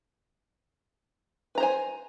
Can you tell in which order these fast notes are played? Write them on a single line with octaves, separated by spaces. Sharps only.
B4 A#5 C5 G#5